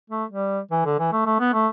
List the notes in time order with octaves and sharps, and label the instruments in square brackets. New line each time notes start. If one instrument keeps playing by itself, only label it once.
[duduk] A3
G3
E3
D3
E3
A3
A3
B3
A3